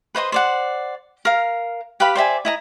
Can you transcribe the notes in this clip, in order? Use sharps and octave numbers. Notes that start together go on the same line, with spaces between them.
B4 C5 D#5 C6
C5 D5 F#5
A#4 F5
G4 B4 F5 B5
C5 D5 E5 G#5
E4 D#5 A#5